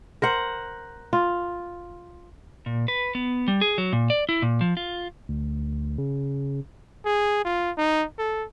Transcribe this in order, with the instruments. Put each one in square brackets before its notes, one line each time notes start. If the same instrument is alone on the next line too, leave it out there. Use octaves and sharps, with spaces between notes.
[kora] A#4 C5 F#5
F4
[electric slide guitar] A#2
B4
B3
G3
G#4
F#3
A#2
D5
E4
A#2
F3
F4
[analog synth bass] D2
C#3
[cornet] G#4
F4
D#4
A4